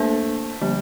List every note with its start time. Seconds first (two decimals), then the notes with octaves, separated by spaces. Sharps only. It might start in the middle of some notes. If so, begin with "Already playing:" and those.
Already playing: A3 A#3 D4 A4 C5
0.61 D3 F3 G3 A#3